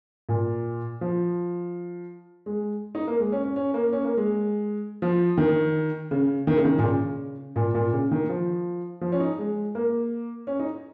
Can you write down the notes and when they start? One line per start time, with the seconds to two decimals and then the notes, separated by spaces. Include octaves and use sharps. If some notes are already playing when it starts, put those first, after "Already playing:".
0.29 A#2
1.01 F3
2.46 G#3
2.95 D#4
3.07 A#3
3.20 G#3
3.32 C#4
3.43 C#4
3.56 C#4
3.74 A#3
3.92 C#4
4.04 A#3
4.17 G#3
5.02 F3
5.37 D#3
6.11 C#3
6.47 D#3
6.56 C#3
6.65 D#3
6.78 A#2
6.83 C#3
7.56 A#2
7.75 A#2
7.93 C#3
8.11 D#3
8.29 F3
9.01 F3
9.12 C#4
9.20 D#4
9.38 G#3
9.75 A#3
10.47 C#4
10.59 D#4